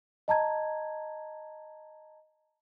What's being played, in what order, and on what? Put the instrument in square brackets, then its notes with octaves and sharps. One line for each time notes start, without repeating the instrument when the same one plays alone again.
[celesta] D#5 A5 A#5 G#6